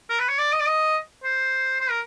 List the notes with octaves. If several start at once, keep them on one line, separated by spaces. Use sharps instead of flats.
A#4
B4
C#5
D5
D#5
D5
D#5
C5
C5
A#4